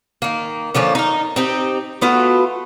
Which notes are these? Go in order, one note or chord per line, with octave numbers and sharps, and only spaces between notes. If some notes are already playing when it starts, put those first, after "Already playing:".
D#3 A#3
D3 F3 A#3 C#4
D#4 A#4
C4 D#4 G4
A3 B3 F4 F#4